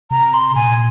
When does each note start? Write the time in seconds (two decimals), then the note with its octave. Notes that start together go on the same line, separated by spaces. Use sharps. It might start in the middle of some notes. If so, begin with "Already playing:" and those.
0.11 C3 A#5
0.34 C6
0.55 A#2 G#5